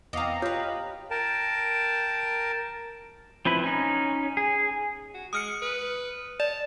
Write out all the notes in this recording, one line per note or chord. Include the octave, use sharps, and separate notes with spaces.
E2 B3 C4 D#5 F5 A#5 D6
F4 G4 B4 C#5 G6
A#4 G5 A5
F3 C4 E4 B4
C#4 D#4
G#4
F#4
G#3 D#6 F6 C#7
B4
D5 A5